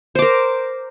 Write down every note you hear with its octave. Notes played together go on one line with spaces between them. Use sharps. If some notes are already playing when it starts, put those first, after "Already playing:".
A#4 C5 D6